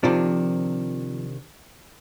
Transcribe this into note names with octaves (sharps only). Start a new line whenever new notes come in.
C3 D#3 F3 D4